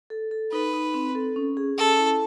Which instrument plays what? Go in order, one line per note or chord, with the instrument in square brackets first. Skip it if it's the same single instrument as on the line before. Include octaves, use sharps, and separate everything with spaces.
[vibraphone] A4
A4
[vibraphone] D#4 [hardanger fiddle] B4
[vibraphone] D#4
C4
A4
C#4
G#4
[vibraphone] C#4 [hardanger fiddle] A4
[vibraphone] E4